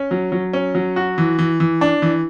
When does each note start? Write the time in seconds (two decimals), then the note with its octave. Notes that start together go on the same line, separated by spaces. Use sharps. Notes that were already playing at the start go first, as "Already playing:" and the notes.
Already playing: C#4
0.11 F#3
0.32 F#3
0.53 C#4
0.75 F#3
0.96 F#4
1.18 E3
1.39 E3
1.60 E3
1.81 D4
2.02 E3